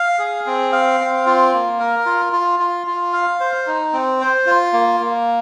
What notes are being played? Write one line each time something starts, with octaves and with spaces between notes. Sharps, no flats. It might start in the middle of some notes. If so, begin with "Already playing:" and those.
Already playing: F5
G#4
C4
F5
C4
F4
A#3
A#4
F4
F4
F4
F4
F5
C5
D#4
C4
C5
F4
A#3
A#3